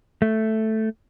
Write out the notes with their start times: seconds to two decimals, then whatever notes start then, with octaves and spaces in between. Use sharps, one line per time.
0.22 A3